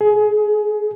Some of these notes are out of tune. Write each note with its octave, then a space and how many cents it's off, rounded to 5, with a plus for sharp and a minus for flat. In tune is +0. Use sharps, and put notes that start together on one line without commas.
G#4 +25